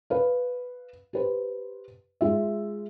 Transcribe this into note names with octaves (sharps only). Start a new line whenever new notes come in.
B4 F5
G4 B4 C5
G#3 F4 E5